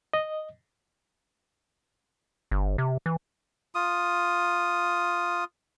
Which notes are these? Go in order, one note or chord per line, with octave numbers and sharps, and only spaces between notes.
D#5
G1
C3
E3
F4 D#6